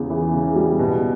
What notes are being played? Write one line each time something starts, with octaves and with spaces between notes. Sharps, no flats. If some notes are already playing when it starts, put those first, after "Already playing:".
Already playing: E2 C#3
E3
C#3
G3
B2